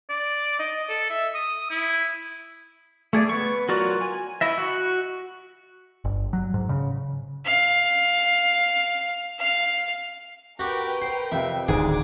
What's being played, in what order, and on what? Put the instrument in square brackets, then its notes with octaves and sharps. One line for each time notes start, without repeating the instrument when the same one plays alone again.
[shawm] D5
D#5
A4
E5
D#6
E4
[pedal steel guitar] A3 G#4 D5
B3 C#6
F#3 F4 F#4 A#4 D5
G#5
E4 D#5 E5
F#4
[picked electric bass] G1
F#3
G#2
C#3
[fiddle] F5
F5
[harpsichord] F#4 G4 [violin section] A#4 B4 G5
[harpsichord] C5
[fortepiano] F2 C3 [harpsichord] E5
[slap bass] D1 G#1 [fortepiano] D2 G#2 [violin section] F#4 D6 [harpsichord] G#4